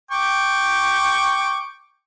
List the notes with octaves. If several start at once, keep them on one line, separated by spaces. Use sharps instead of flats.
G5 C#6 D6